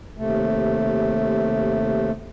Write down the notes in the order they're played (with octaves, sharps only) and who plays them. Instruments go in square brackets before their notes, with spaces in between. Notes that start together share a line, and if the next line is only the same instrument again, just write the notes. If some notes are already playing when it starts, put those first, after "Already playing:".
[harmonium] D#2 C3 A3